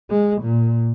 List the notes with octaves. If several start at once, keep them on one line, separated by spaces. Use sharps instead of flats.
G#3
A#2